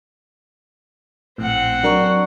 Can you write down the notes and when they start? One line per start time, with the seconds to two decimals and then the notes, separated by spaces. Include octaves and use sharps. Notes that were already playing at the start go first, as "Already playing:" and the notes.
1.38 A#1 A2 C4 F#5
1.83 F#3 D4 A#4 D5 A#5 C#6